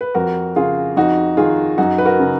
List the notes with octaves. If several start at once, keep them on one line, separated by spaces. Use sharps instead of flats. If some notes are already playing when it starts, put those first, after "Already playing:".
B4
F2 F#4 A#4
C#3 F4 G#4
F2 D#4 F#4
D#3 F4 G#4
F#2 D#4 F#4
B4
F#4 A#4
C#3